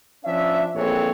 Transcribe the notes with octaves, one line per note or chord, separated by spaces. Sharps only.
F3 C#4 D4 E5
A#1 F2 E3 C4 A4 C#5